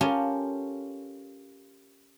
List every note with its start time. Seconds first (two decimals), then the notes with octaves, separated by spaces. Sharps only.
0.01 C#4 F4 G4 A4 A#4 C#5